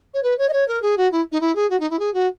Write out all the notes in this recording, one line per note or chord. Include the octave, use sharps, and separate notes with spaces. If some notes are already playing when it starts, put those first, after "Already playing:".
C#5
B4
C#5
D#5
C#5
A#4
G#4
F#4
E4
D#4
E4
G#4
F#4
D#4
E4
G#4
F#4